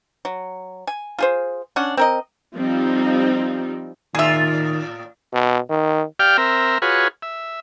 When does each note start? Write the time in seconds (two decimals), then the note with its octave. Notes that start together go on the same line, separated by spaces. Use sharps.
0.25 F#3
0.87 G#5
1.18 F4 G#4 C5
1.76 C#4 D4 F#5
1.97 C4 A#4 D#5
2.55 F3 G3 C4 D#4
4.15 A2 D#3 F4 G#4 E5
5.33 B2
5.70 D#3
6.19 G4 D5 F5 G5 F6
6.38 C4 A#4 E5
6.82 F4 F#4 G#4 B4 C#5
7.22 E5